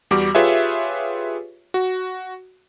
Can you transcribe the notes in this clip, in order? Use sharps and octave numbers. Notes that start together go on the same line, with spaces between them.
E2 G3 F#4 D6
F4 G4 G#4 B4 C#5 E5
F#4